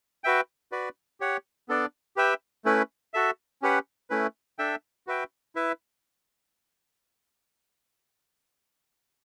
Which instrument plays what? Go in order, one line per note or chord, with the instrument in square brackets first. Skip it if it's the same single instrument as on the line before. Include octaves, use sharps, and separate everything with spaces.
[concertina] F#4 B4 E5 G5
F#4 B4 D5
G4 C#5 F#5
B3 D4 A4 D5
G4 B4 E5 G5
A3 C#4 E4 B4
F#4 A4 E5
C#4 G4 B4 F#5
A3 C#4 E4 B4
D4 A4 E5 G5
F#4 B4 E5 G5
E4 B4 E5